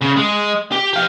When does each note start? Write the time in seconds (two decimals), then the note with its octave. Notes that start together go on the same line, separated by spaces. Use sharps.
0.02 C#3
0.17 G#3
0.72 G4
0.93 G4 F5